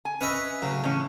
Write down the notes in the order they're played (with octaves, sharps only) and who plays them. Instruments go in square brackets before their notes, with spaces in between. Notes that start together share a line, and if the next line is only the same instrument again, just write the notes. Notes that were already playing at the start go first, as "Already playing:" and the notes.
[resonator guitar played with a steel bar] G#5
[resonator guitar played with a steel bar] C#4 [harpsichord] B4 D#5 E5
[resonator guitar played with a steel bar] A2 F#3 [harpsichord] C#3
[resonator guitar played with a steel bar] A2 E3 C#4